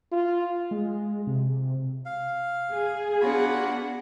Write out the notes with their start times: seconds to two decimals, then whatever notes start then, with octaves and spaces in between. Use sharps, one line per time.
0.12 F4
0.71 G#3
0.85 G#3
1.27 C3
2.06 F5
2.71 G#4
3.21 B3 D4 F4 F#4 F#5 B5